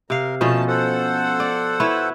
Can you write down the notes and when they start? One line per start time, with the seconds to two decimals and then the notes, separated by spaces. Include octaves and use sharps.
0.10 C3 A#4 F5
0.41 B2 F3 A3 C#4 A5
0.68 A4 C5 F#5
1.40 D5
1.80 E4 B4 C#5